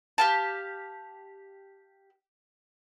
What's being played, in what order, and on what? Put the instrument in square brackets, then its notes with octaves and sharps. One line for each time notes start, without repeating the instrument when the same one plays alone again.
[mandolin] G4 F5 A5